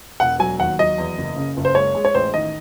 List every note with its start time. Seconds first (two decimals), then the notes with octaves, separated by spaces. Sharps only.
0.20 E1 F#5
0.39 F#3 G#5
0.59 D#2 F#5
0.79 F#3 D#5
0.98 E2
1.18 F#1
1.36 C#3
1.57 F#1
1.65 C5
1.75 G#3 C#5
1.95 G#3
2.05 C#5
2.15 A1 C5
2.34 D#3 D#5